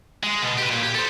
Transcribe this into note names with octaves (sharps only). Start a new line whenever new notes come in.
G#3
B2
G4 B4
A#2
G4
A4 C5